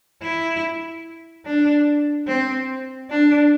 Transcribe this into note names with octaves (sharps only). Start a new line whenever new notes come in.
E4
D4
C4
D4